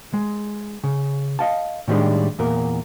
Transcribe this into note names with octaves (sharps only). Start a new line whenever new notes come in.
G#3
C#3
D#5 F5 A5
A2 D#3 F3 G3 G#3 D4
E2 A#2 A#4